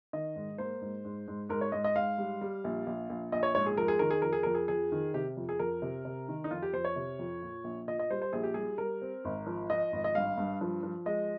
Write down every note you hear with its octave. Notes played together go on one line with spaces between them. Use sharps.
D#3 D#5
G#2
A#3 C5
G#2
G#2
G#2
G#2 A#4
C#5
G#2 D#5
D#5
G#2 F5
G3
G3
A#1
A#1
A#1
A#1 D#5
C#5
G#2 C#5
G#4
F2 A#4
G#4
D#3 A#4
G#4
F2 A#4
G#4
F2 A#4
G#4
F2 G#4
D#3
C3 G4
F2
G#4
F2 A#4
C3
C3
D#3
D#4
F2 F4
G4
F2 C5
C#5
C3
F2
A#2
A#1
A#2 D#5
D#5
G3 C5
C5
A#1 G#4
G4
G3 G#4
G3 A#4
C4
G#1
F3
F3 D#5
G#1
D#5
G2 F5
G2
F3
F3
G#3 D#5